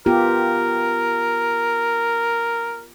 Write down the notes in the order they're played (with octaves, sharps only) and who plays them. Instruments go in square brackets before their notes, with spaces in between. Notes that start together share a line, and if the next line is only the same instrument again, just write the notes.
[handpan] B3 F4 G4 [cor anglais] A#4